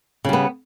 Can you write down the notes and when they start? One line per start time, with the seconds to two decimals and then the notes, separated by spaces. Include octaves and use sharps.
0.25 C#3
0.29 G3
0.33 B3